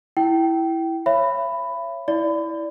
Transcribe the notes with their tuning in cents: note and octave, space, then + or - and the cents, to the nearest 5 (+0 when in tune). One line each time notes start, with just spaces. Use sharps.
E4 +0 G5 -20
C#5 -15 E5 +40 B5 +10
E4 -10 D5 -10 B5 +30